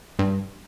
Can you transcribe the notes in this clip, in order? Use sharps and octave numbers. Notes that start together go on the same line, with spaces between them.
G2